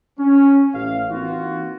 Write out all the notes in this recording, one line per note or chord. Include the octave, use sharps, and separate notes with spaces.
C#4
A1 F5
E3 A#3 C4 D#4 F4 F#4